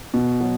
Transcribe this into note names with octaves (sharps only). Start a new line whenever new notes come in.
B2
F#3